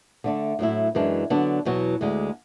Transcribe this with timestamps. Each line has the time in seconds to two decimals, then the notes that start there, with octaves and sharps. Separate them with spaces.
0.24 D3 A3 D4
0.59 A2 F#3 A3 E4
0.95 F#2 E3 G#3 D4
1.30 D3 F#3 B3 D4
1.65 E2 B2 F#3
2.01 D2 D3 G#3